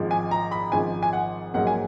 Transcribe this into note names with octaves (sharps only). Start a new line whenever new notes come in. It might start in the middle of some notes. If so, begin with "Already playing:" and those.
Already playing: G#1 G#2 F3
G#5
A#5
B5
G#1 G#2 F3 G#5
G#5
F#5
A#1 G#2 F#3 A#3 F#5
G#5